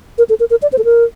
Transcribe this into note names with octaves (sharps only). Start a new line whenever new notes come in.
A#4
A4
A#4
A#4
D5
C5
A4
A#4